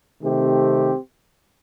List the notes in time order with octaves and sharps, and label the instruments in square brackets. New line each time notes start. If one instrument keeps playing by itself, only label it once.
[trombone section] C3 D#3 A3 C4 G4